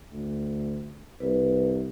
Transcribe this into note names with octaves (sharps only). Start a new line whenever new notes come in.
D2
C2 B4